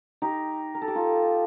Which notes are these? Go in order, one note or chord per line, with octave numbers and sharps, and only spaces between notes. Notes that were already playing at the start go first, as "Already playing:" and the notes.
D#4 G4
A#4
A4
G4
F4 A4